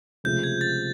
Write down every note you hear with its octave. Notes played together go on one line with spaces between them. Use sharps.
C#2 C3 F3 A3 G6
G#6
A6